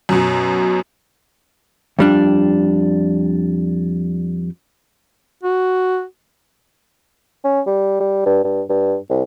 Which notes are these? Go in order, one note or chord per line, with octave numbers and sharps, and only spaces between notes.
F#2 B2
F2 G3 D4
F#4
C#4
G3
G3
G2
G2
G2
C2